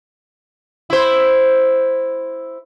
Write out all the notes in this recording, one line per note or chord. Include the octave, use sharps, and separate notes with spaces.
E4 C5